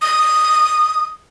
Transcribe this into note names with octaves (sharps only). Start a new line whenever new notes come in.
D#6